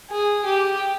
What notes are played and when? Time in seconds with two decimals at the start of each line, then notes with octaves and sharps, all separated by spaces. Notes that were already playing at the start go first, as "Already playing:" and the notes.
0.10 G#4
0.45 G4